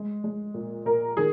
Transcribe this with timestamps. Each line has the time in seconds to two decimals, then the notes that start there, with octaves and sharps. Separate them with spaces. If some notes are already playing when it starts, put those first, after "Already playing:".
Already playing: G#3
0.24 G#3
0.54 A#2
0.86 A#2 A#4
1.17 D#3 G#4